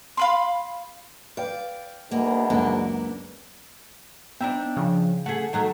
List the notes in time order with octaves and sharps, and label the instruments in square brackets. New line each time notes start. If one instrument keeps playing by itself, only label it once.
[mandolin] F5 B5 C6
[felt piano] B4 F5 G5 [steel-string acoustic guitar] D5
[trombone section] D2 G#2 B2 [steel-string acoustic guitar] A#3
[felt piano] F#1 C#2 F#2 [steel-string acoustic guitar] A#3 B3 D4
[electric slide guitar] B3 [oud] D4 D#4 E5 [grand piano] G5
[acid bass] C#3 [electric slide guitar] F3
[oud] A3 G#4 [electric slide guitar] F#5
[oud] D#3 F#3 A3